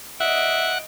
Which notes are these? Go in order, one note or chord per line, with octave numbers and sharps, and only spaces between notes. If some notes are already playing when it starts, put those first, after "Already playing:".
D#5 E5 F#5 D7